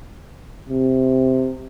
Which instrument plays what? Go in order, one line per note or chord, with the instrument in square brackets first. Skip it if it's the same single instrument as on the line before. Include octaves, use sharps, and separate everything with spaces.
[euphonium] C3